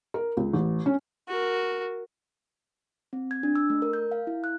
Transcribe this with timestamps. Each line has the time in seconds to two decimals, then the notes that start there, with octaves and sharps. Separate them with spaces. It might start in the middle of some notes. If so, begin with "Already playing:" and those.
0.14 A#4
0.37 C#2
0.53 A1
0.86 C#4
1.28 F#4 A#4
3.13 C4
3.31 G#6
3.43 D4
3.55 E6
3.70 A3
3.82 A#4
3.93 G6
4.11 F5
4.27 E4
4.44 F#6